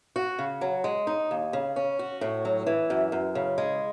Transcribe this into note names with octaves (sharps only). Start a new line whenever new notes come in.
F#4
C#3
F#3
G#3
D#4
D#2
C#3
C#4
F#4
A2
F#3
E3
F#2
F#2
C#3
G#3